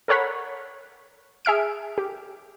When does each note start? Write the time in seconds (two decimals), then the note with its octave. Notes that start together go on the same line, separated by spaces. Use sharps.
0.08 A4 A#4 C#5 F#5 B5
1.45 G#4 E5 F6 D7
1.98 G4